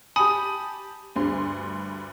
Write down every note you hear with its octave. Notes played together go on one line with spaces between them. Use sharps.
G4 G#5 A5 B5 D#6
D2 G2 C6